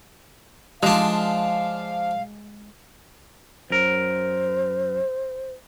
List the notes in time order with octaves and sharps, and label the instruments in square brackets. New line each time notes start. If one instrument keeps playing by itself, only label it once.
[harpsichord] F3 D4 [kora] G#3 [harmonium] F5
[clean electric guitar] F#2 A#4 [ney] C5